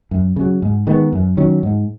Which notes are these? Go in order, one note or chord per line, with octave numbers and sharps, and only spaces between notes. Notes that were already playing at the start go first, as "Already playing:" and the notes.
F#2
C#3 F#3
G#2
D#3 G#3 B3
F#2
D#3 F#3 C#4
G#2